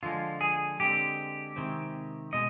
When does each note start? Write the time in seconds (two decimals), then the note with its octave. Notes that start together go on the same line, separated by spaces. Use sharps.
0.03 D3 F3 G#3 F4
0.41 G#4
0.80 D3 G#3 C4 G4
1.56 C3 D#3 G#3 C4
2.33 B2 G#3 D#5